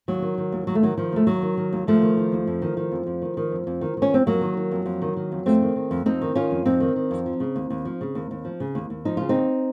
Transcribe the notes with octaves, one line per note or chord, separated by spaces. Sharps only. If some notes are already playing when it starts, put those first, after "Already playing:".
D#2 F#3
D#3
D#3
D#2
D#2 F#3
A3
D#3 F#3
D#3 F3
D#2 A3
D#2 F#3
D#3
D#3
D#2
D#2 F3 A3
D#3
D#3
D#2
F2
D#3
D#3
F2
F2
D#3
D#3
F2
F2
D#3
D#3
C#4
F2 C4
F2 F#3 A#3
D#3
D#3
F2
F2
D#3
D#3
F2
F2 A3 C4
D#3
D#3
F2
F2 C4 D#4
D#3
D#3 C#4 F4
F2
F2 C4 D#4
D#3
D#3
F2
F3
C#3
D#2
D#2
F3
C#3
D#2
D#2
F3
C#3
D#2
D#2
F3 D#4
C#3 F4
C4 D#4
D#2